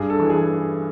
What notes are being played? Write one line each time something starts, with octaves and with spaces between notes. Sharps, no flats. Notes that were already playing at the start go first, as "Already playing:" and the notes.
Already playing: G2 G#4
A4
E3
G#4